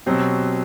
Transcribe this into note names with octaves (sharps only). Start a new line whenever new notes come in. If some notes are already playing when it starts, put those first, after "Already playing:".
B2 F#3 C4 G4